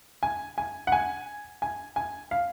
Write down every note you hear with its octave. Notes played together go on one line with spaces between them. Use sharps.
G#5
G#5
F#5
G#5
G#5
G#5
F5